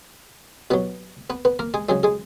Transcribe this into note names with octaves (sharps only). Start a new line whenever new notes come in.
B2 F#3 B3 B4
B3 B4
B3 B4
A#3 A#4
G#3 G#4
C#3 F#3 G#3 G#4
G#3 G#4